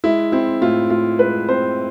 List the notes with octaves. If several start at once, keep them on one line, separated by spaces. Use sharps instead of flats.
G#3 E4
C4 E4
A2 F4
A2 F4
G#3 B4
C4 C5